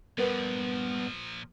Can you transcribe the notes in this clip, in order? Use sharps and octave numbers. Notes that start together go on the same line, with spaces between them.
G2 A#2 F3 B3 A#4 B4